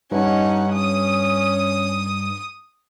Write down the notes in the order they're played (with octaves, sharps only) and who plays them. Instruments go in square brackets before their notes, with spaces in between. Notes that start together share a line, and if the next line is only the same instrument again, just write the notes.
[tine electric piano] G2 [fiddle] C#4 F#5 [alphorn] D#4
[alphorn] C#4 [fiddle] D#6